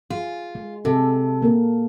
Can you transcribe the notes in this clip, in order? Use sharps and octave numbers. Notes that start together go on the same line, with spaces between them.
F4 G#4
G#3
C3 G#4 A4
A#3 A#4